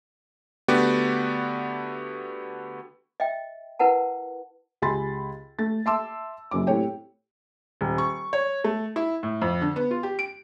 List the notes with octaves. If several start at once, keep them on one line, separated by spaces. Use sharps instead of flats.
D3 A3 B3 F#4 G4 D5
D#5 E5 G5
E4 A#4 B4 F#5 A5
C#2 G4 G#5 B5 C6 A6
A3 A6
E5 A5 C6 D6 E6
F#1 F#2 C#4 D6
A2 C4 G4 C#5 G5
D#1
C#6
C#5
A3
E4
A2
F2
D3
B3
F4
G4
D7